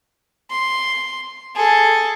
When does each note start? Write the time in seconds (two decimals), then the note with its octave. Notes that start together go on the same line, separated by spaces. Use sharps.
0.50 C6
1.56 G#4 A4